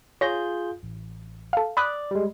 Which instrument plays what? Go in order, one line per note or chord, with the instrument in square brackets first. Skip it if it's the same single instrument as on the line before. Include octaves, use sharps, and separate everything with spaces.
[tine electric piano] F4 G#4 G6 [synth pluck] C#5 A#6
[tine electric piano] A1
[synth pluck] A4 F5
[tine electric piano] D5 [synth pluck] B5 D#6 F#6
[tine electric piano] G3 G#3